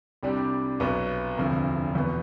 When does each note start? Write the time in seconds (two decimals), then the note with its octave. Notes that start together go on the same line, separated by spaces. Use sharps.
0.23 C2 C3 G3 D4 G4
0.80 B1 B2 B3
1.38 E1 D2 C3 F3
1.95 E2 B2 B3